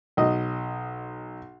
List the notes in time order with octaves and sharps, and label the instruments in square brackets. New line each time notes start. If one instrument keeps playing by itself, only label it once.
[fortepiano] B1 D#5